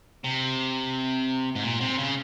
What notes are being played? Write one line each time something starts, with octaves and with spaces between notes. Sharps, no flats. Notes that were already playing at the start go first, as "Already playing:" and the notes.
C3
G#2
A#2
C3
C#3